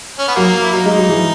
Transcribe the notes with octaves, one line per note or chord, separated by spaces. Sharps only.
C#4
B3
F#3 A#3
E4
F#3 D#4
G#3
F#3
E3